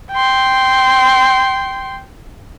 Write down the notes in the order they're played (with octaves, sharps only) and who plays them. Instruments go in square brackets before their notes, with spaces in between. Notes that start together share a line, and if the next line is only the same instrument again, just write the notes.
[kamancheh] G5 C6